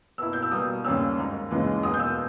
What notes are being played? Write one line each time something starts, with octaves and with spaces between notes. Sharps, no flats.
B2 A#3 E4 E6
G6
E6
B2 G3 A#3 D#6
D#2 C#3 G3 A#3 C#4 E6
G#2 D#3 A#3 D#4
D#2 C#3 E3 G#3
E2 B2 A#3 D#4 D#6
G6
E6